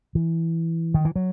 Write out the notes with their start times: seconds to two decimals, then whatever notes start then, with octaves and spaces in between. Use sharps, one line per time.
0.15 E3
0.94 D#3
1.05 E3
1.16 F#3